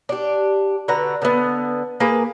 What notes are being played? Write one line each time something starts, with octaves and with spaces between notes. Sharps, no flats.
D4 G4
D3 F#4 B4 A#5
D3 B3
A#3 G#4 B4